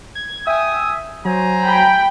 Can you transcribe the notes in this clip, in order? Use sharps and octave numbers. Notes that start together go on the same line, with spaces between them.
G#6
E5 G5 G#5 D#6
F#3 C5 G#5 A#5
G5 B5